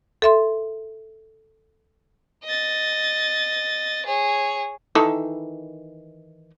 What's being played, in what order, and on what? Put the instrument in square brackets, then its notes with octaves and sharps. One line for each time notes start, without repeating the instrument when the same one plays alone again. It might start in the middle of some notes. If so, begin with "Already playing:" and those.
[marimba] A4 E5 C6
[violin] D#5 A6
G#4 C#5
[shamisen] D#3 E3 A4